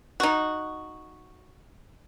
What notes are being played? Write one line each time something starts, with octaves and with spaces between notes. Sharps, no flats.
D#4 F#4